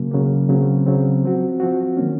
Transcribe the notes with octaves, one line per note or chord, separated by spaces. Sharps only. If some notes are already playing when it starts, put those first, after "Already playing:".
Already playing: C#3 F#3 A#3
C#3 F#3 A#3
C#3 F#3 C4
C#3 F#3 C4
F3 C4 F#4
F3 C4 F#4
D#3 F#3 A#3 C#4